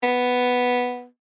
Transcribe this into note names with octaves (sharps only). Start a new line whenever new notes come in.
B3